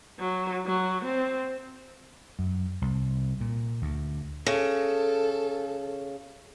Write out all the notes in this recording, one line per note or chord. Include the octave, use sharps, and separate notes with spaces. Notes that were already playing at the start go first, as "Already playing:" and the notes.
F#3
F#3
C4
F#2
C2
A#2
D2
C#3 A4